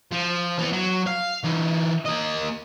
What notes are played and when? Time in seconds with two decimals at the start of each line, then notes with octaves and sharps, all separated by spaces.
0.12 F3
0.58 E3 B3
0.73 F#3
1.07 F5
1.44 E3 D#4
2.06 A#3 D#5